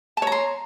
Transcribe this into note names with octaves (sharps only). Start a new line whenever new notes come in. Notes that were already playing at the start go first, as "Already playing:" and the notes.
C#5 A5 A#5 C6